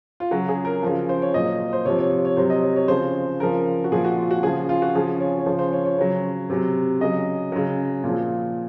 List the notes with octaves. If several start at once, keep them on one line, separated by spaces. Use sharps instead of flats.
F4
C#3 F#3 F#4
G#4
A#4
C#3 F3
C5
C#5
A#2 F#3 D#5
C5
C3 F3 C#5
C#5
C#5
C#5
C3 F#3 C5
D#5
C#5
C#5
C#3 F3 C5
C#3 F3 A#4
F#4
A#2 F3 G#4
F#4
F4
F#4
C#3 F3 G#4
F4
F#4
C#3 F3 G#4
C#5
C#5
C#3 F3 C5
C5
C#5
C#5
C#3 F#3 C#5
C3 F#3
C#3 F#3 D#5
C#3 F#3
A#2
F3